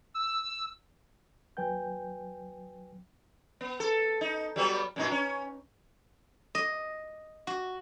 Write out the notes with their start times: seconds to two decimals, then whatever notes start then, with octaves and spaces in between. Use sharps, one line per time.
0.14 E6
1.57 D#2 F#3 B4 G5 G#5 G6
3.61 B3
3.80 A4
4.21 D#4
4.56 F#3 G3 B3
4.96 F#2 A#2 D#4
5.12 C#4
6.55 D#5
7.47 F#4